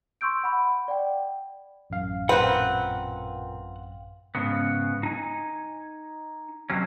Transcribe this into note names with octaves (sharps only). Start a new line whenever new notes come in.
C6 C#6 E6 G6 D7
F#5 B5
D5 F#5 G5
A1 F#2 F5
A#2 A#3 C4 B4 F#5 F#6
G#2 C#3 B3
D#4 G#5
F2 C3 F#3 C#4